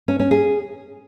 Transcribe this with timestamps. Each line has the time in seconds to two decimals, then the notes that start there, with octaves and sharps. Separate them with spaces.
0.08 C#4
0.20 C#4
0.31 G#4